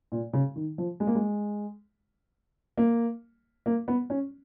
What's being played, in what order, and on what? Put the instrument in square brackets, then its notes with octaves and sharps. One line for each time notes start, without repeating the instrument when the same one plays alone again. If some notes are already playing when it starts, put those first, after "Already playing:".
[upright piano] A#2
C#3
D#3
F3
G#3
A#3
G#3
A#3
A#3
B3
C#4